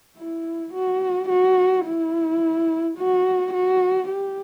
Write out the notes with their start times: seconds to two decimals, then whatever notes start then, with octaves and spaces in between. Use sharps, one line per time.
0.18 E4
0.74 F#4
1.29 F#4
1.86 E4
2.98 F#4
3.53 F#4
4.09 G4